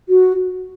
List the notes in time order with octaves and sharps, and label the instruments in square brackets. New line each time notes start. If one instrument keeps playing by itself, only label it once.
[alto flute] F#4